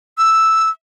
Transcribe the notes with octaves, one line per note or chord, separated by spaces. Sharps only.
E6